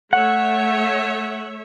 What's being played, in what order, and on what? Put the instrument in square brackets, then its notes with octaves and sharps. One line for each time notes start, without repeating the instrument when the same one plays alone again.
[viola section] A3 C#5 E5 [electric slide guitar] F#5